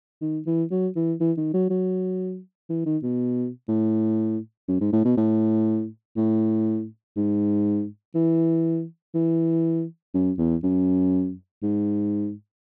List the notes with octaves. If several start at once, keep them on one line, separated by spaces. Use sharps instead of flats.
D#3
E3
F#3
E3
E3
D#3
F#3
F#3
E3
D#3
B2
A2
F#2
G#2
A2
B2
A2
A2
G#2
E3
E3
F#2
E2
F#2
G#2